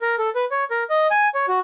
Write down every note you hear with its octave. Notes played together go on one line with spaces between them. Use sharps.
A#4
A4
B4
C#5
A#4
D#5
G#5
C#5
F#4